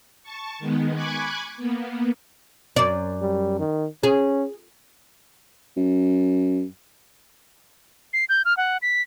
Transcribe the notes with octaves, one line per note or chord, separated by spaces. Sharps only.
A5 C#6
D#3 G#3 B3
G#5 B5 C#6 D6 F#6 G#6
A#3 B3
F#2 D5
G3
D#3
C#4 G#4
F#2
C7
G6
F6
F#5
B6